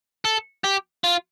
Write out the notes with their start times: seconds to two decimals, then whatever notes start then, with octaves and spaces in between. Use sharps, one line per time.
0.25 A4
0.64 G4
1.04 F4